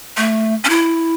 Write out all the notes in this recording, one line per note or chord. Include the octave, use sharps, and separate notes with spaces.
A3
C#4
E4